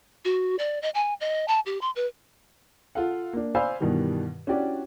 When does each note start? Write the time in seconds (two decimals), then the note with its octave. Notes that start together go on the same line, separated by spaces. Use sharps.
0.25 F#4
0.59 D5
0.82 D#5
0.94 G#5
1.21 D#5
1.48 A5
1.66 G4
1.81 C6
1.96 B4
2.95 F4 A4 F5 F#5
3.33 A#3 D4
3.55 C5 D5 F5 G#5 B5 E6
3.80 G2 B2 D#3 E3 G3
4.47 C#4 D4 E4 F#4 G4 D5